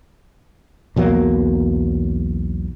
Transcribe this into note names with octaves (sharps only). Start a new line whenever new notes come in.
B1 E2 F#3 A#3